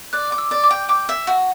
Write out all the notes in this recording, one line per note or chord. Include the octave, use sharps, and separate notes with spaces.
D5 F#6
D6
E6
D5
D6
G5
G5 D6
E5
F#4